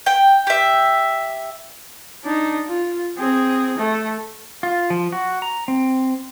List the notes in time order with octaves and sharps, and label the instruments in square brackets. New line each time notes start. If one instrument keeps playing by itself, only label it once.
[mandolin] G5
G4 E5
[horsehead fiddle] D4 D#4
F4
C4 G#4
A3
[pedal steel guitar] F4
F3
F#4
A#5
C4